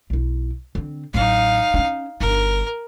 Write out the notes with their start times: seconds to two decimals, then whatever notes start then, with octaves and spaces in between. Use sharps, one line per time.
0.10 B1 E4
0.75 D3 C4
1.14 A1 F#3 D#4 F5
1.74 C#4 D4
2.21 G1 D#4 A#4